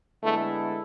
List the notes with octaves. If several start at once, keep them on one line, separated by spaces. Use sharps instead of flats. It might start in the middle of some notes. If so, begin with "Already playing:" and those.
D3 G#3 A3 B3 E4 A4